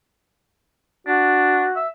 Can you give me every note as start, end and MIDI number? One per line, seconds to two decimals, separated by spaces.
1.07 1.65 62
1.07 1.79 66
1.76 1.88 76